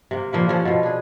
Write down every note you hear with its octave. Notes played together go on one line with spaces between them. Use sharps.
C3 A#3
A#2 F3 A#3 B4
C3 F3 C#4 A4
B2 F3
D4 G#4